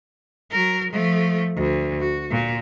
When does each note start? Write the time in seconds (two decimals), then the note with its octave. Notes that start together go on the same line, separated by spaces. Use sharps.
0.51 F#3 A#4
0.91 F3 A3
1.56 D2
1.99 F#4
2.31 A#2